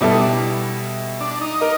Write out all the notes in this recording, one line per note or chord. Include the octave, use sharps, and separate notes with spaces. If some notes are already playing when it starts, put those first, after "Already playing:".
B2 G3 B3 D4 E4 A4
D#4
D4
D4
D#4
A#4 D#5